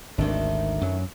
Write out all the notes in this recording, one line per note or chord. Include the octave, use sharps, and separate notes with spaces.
G#1 D2 D#3 A3 D4
F#2 F#3